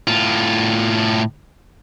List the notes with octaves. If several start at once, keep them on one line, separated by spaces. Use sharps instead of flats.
A2 F4